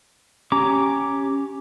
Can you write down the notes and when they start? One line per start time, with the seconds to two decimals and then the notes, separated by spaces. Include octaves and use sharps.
0.52 C#4 G4 A#5 D6